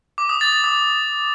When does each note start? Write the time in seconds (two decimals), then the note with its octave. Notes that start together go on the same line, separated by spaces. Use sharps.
0.18 D6
0.29 D#6
0.41 A6
0.53 A6
0.64 D#6